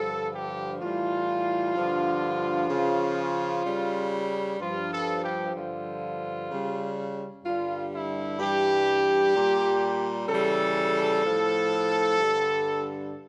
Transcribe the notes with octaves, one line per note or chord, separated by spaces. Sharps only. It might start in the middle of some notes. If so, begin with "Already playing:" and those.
Already playing: G2 D3 F3 A4
G4
A2 E3 G3 F4
G2 D3 F3
C#3 F3
C#3 G3
G2 F3 F4
A4
G4
G2 D3 F3 F4
C#3 G3
G2 D3 G3 F4
E4
G2 E3 G3 G4
A#2 G3
C#3 E3 G3 A4
A2 F3
G2 D3 G3